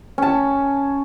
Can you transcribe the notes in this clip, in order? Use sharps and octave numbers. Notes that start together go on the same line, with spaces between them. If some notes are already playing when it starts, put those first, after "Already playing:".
C#4 A5